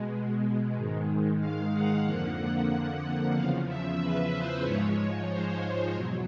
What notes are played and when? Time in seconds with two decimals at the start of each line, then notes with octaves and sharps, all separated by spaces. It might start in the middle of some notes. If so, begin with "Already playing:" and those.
Already playing: B2 G#3
0.75 G#2 D#3 G#3
1.40 F5
1.73 F#5
2.04 F2 D3 F3 A#3
3.34 E2 C#3 F3 F5
3.66 E5
3.99 B4
4.31 C5
4.64 G#2 F3 G#3 C#5
5.29 C5
5.94 E2 B2 F#3